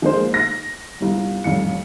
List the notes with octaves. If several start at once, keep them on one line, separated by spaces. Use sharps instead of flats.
F3 G#3 A#3 D#4 C5
A#6
G1 C2
D#1 A1 F2 C#7